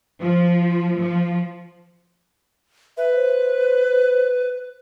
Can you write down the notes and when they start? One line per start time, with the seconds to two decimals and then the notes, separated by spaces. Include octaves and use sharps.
0.20 F3
0.98 F3
2.97 B4 E5
3.15 C5